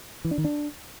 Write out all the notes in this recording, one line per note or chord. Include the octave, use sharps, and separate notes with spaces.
E3
D4
D#3
D4